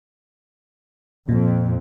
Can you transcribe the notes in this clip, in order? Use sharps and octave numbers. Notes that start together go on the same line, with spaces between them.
F2 A#2